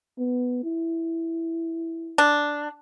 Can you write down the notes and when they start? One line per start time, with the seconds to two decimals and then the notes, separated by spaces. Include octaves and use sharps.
0.19 B3
0.64 E4
2.18 D4